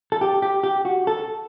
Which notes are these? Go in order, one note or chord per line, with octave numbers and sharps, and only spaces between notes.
A4
G4
G4
G4
F#4
A4